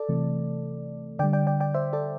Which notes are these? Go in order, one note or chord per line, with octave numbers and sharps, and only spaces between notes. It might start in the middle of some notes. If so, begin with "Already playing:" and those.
Already playing: A4 D5
C3 E3 A3
D3 G3 D5 G5
D5 G5
D5 G5
D5 G5
C5 E5
A4 D5